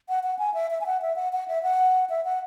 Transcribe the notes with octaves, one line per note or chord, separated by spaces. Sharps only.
F#5
F#5
G#5
E5
E5
G#5
F#5
E5
F#5
F#5
E5
F#5
E5
F#5